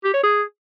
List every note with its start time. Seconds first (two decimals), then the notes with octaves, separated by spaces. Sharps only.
0.04 G4
0.14 C#5
0.24 G#4